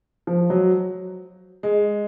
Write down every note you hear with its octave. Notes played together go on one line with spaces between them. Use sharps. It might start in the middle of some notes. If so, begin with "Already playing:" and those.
F3
F#3
G#3